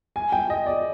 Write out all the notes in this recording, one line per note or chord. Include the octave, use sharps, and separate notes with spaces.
G#5
G5
D#5
D5